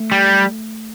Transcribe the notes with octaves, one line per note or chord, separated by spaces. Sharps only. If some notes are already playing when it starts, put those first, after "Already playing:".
Already playing: A3
G3